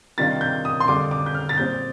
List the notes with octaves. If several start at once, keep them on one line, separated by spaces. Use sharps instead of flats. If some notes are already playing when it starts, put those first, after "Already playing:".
C3 D#3 G3 D4 F4 A6
G6
D#6
C6
F2 D3 G3 D4 F4 D6
D6
G6
F6
A6
A#2 G3 C4 G6